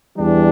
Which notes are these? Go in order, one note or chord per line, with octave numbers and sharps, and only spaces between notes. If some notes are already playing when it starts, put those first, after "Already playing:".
E2 E3 G3 D4